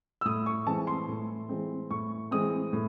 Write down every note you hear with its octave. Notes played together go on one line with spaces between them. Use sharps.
E6
A2 D#6
C#6
E3 G#3 C4 A5
C6
A2
E3 G#3 C4
A2 C#6
E3 G#3 C4 D#6
A2